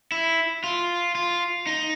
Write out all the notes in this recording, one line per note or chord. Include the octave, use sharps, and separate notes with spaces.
E4
F4
F4
D#4